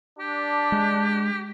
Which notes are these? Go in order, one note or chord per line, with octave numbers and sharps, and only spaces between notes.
D4 G4
G#3